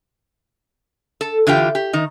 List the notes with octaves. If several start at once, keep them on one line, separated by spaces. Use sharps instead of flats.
A4
D3 E3 F4 G4 G5
G4
D#3 D#4